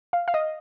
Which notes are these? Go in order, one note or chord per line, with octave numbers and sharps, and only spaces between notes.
F5
F5
D#5